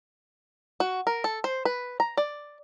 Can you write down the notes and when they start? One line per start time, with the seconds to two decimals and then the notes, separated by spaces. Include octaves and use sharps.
0.80 F#4
1.07 A#4
1.24 A4
1.44 C5
1.65 B4
2.00 A#5
2.17 D5